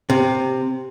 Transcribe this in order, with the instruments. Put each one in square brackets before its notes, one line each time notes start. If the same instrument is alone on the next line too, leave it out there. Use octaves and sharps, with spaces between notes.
[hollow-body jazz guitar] C3